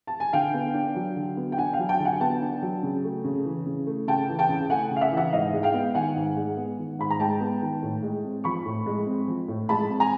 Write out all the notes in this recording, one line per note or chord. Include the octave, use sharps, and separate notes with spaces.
A5
G#5
D3 F5 G5
B3
D4
F#3
D3
B3
G5
D4 F#5 G#5
F5 G5
F#3
G5 A5
D3
F#5 G#5
B3 G5 A5
D4
F#3
C#3
A3
C#3
E3
C#3
A3
C#3 G5 A5
E3
G5 A5
C#3
A3 F#5 G#5
C#3
F5
E5 F#5
E3
E5 F#5
G#2 D#5 F5
G#3
F5 G5
B3
D#3 F#5 G#5
G#2
G#3
B3
D#3
G#2 B5
A#5
G#3 G5 A5
B3
D#3
A2
G#3
C4
F3 B5 C#6
A2
G#3
C4
F3
A2
G#3 A5 B5
C4
G#5 A#5